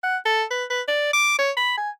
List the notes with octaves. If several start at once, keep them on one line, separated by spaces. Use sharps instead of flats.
F#5
A4
B4
B4
D5
D6
C#5
B5
G#5